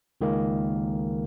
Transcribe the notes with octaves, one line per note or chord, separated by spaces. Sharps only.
C#2 D#3 G#3 A#3